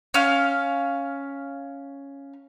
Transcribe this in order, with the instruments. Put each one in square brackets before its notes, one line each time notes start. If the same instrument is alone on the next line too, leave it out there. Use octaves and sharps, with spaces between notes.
[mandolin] C#4 F5